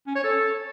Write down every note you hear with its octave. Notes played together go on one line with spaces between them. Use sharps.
C#4
C#5
A4